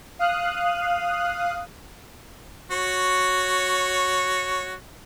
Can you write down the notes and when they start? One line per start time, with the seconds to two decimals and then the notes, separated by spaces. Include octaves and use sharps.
0.19 F5 D#6 F#6
2.71 F#4 C#5